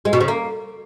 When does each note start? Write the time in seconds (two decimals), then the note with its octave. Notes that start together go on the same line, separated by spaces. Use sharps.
0.05 G#3
0.13 B2
0.20 C#3
0.28 A#3